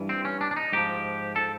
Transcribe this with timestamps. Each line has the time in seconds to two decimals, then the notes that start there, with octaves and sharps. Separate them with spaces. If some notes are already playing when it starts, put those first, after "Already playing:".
Already playing: G2 E3
0.09 C4
0.25 C#4
0.41 D4
0.51 D4
0.56 D#4
0.73 G#2 F3 G4
1.36 A4